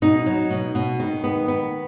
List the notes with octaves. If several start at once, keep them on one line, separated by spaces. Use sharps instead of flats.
B2 D#4
F#3
B2
B2
D#3
B3
B3